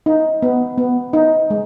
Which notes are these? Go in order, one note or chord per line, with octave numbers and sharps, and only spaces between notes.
D#4
B3
B3
D#4
G#3